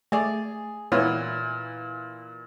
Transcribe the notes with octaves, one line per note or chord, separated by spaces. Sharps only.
A3 G#4 D5
A#2 E3 B3 E4 C#5